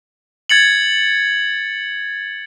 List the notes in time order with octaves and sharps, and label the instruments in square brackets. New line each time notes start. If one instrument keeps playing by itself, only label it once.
[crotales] G#6 A6 C#7 F#7